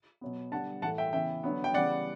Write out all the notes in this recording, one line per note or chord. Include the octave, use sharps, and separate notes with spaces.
B2 F#3 B3
D3 G3 B3 F#5 A5
A2 E3 A3 F#5 A5
E5 G5
C#3 E3 B3 E5 G5
D3 F#3 B3
G5
C#3 E3 G3 B3 D5 F#5